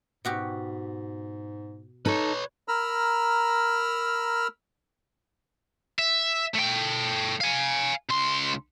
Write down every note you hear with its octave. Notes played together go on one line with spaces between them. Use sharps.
G#2 B2 F#4 G4
D#4 A4 B4 C#5
A#4 A#5 B5 E6 F6
E5
A3 G5
F5 G#5
C#2 C6